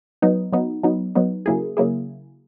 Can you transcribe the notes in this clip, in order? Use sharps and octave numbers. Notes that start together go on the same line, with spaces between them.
F#3 B3 D#4
F#3 B3 D#4
F#3 B3 D#4
F#3 B3 D#4
C#3 F#3 A#3 E4 G#4
C#3 F#3 A#3 E4 G#4